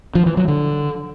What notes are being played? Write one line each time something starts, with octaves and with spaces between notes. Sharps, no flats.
F3
E3
F#3
D3